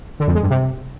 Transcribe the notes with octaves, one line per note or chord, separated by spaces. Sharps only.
D3
F2
G#3
G2
C3